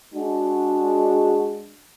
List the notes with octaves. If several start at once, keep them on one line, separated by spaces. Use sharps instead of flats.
G#3 D4 F#4